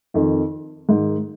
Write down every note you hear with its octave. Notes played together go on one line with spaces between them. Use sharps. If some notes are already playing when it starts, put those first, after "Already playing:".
F2 D#3
G#2 D#3